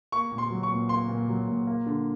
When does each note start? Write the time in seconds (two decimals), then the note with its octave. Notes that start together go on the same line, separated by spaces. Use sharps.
0.12 A#3 C#6
0.32 A#2
0.38 C6
0.51 F#3
0.63 C#6
0.71 A#2
0.89 A#3 C6
1.09 A#2
1.29 F#3
1.48 A#2
1.67 A#3
1.86 D3